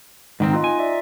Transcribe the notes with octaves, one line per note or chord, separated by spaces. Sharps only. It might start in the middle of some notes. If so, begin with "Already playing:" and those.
G#2 D#3 C4
D#4 F4 D#5
G#5
F4 D5 E5